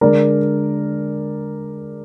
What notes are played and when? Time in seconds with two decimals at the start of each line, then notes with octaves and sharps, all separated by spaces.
0.01 D3 G#3 D4 A#4 D5